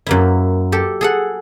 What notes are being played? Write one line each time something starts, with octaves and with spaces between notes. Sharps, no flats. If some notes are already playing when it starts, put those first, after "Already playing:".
F#2 A#3 E4
G4 A4
G#4 A4 F#5